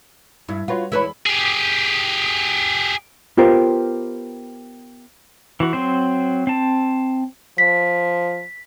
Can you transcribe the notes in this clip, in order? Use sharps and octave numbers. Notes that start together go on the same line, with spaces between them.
G2 E4
F4 F#4 B4 C#5
E1 E4 B4 C#5 B5
G4 G#4
B3 F4 G4 A#4 C5
E3 F#4
F#3 C4 C5
C4 A5
F3 B6